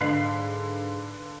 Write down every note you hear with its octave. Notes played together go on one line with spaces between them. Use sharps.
G#2 D3 B4 F5 B5